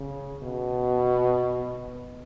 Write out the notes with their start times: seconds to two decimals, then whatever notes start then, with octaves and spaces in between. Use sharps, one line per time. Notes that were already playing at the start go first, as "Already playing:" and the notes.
Already playing: C#3
0.43 B2